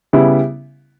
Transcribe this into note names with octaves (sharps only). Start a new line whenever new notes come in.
C#3 G3 B3 E4